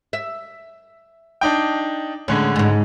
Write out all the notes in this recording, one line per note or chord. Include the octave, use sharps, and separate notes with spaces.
E5
D4 D#4 G5
A2 D3 G#3 C#4
G#2 C#3